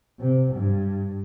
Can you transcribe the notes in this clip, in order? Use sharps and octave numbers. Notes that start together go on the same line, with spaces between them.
C3
G2